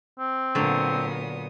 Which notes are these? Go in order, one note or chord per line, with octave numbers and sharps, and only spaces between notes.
C4
A#2 D3 F#3 B3 D#6